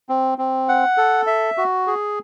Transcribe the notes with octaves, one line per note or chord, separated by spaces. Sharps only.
C4
C4
F#5
A4
E5
F#4
G#4